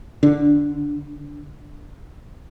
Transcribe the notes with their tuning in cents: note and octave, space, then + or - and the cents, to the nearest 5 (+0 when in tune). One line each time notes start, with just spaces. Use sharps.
D3 +0 D4 -15